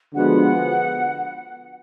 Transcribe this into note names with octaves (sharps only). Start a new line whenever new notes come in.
D3 F3 G#3 B3 F#4 F#5